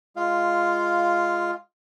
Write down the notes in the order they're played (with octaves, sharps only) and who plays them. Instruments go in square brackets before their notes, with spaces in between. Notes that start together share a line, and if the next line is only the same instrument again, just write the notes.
[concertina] G#3 F4 F5